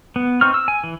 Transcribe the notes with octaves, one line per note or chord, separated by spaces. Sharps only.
B3
C4 D#4 C#6 F6
E6
G#5
E3